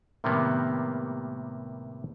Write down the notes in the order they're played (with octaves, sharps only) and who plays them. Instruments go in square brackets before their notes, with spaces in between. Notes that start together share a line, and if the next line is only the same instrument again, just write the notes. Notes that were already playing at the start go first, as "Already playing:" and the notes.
[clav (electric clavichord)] A2 C3 D#3 G3 A#3 B3